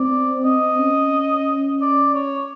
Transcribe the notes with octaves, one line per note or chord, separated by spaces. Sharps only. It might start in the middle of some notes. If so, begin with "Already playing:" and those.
Already playing: C4 D5
C4 D#5
C#4
D5
C#5